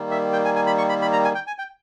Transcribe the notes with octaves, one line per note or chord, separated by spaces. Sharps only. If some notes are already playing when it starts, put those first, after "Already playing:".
Already playing: D#3 G3 A#3
E5
G5
G#5
G#5
B5
C#6
B5
B5
A#5
G#5
G5
G#5
G5